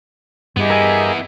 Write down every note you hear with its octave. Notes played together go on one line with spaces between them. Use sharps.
G2 B3 E4 G4 G#4 D#5
A#4 E5 G#5